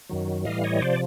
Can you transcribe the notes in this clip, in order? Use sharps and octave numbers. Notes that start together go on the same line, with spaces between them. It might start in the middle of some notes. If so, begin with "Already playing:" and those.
F#2 D#3 F#3
A2 E3 G3 D#5 F5
C#5 D#5
C3 F3 C5 D5